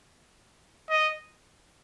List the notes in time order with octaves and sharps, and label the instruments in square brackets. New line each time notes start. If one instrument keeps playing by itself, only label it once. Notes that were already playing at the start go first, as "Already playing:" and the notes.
[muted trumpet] D#5